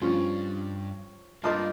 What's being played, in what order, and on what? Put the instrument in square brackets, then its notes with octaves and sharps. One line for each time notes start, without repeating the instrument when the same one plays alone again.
[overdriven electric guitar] G2 [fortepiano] F3 C#4 F4
[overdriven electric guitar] G2 [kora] A#3 D#4 F4 [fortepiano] A5 D#6